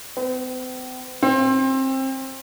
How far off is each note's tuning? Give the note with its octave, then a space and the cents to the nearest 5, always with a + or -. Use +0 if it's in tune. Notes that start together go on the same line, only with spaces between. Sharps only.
C4 -45
C4 +25